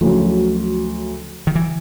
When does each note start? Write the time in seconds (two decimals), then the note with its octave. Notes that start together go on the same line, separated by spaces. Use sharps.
0.01 D2 C#3 F3 F#3
1.47 D#3
1.55 E3